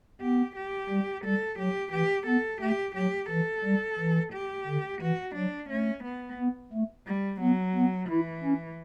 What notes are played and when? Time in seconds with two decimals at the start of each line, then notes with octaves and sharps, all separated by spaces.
0.21 B3 G4
0.56 G4
0.90 G3
1.25 G3 A4
1.58 F#3 G4
1.92 E3 G4
2.26 B3 A4
2.61 A3 G4
2.95 F#3 G4
3.29 E3 A4
3.65 G3
3.99 E3
4.33 G4
4.67 D3
5.01 E3 F#4
5.35 F#3 D4
5.70 A3 C#4
6.03 B3
6.38 B3
6.73 A3
7.07 G3
7.41 F#3 B3
7.75 B3
8.09 E3 E4
8.44 C#4